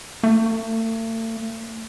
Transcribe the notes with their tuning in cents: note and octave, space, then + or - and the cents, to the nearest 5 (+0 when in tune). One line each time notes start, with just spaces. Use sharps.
A3 +40